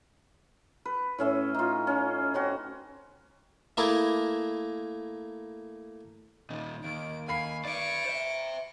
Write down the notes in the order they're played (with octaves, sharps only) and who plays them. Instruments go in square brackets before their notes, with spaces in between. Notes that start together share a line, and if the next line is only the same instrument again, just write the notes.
[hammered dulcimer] B4
A2 C#4 E5
D#4 F4
C#4
C4 C#4 F#4
[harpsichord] A3 A#3 E4 G#4 A#4
[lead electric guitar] A#2 D#3
[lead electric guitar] D#2 [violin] D7
[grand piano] F5 B5 C7 [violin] G#5
[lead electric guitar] B4 D5 [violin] C#6 D7
[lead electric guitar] C5 E5